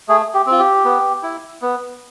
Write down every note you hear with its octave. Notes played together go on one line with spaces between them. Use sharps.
A3 G#4
G4
C4 F4
G4
B3
E4
B3